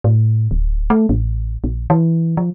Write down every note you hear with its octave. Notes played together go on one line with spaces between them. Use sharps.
A2
D1
A3
A1
A#1
E3
F3